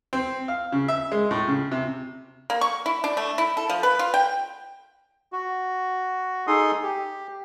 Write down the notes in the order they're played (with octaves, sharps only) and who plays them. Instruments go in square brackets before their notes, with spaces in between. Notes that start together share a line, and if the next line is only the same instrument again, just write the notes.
[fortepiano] C4
F5
C#3
E5
G#3
A2
C#3
C3
[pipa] A#3
C#6
E4
D4
A3
E4
A4
F3
B4
F4
G5
[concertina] F#4
D#4 G#4 A4 C6 D#6
G4